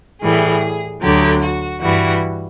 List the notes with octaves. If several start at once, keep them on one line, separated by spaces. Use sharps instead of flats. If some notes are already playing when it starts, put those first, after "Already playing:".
A2 E3 G3 G#4
D2 D3 F#3 G4
F#4
G2 E3 G3 F#4